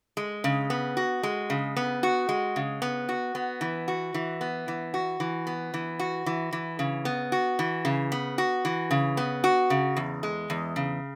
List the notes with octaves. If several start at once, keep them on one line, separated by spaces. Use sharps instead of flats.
G#3
C#3
B3
F#4
G#3
C#3
B3
F#4
G#3
C#3
B3
F#4
B3
E3
F#4
E3
B3
E3
F#4
E3
B3
E3
F#4
E3
E3
C#3
B3
F#4
E3
C#3
B3
F#4
E3
C#3
B3
F#4
C#3
E2
G#3
E2
C#3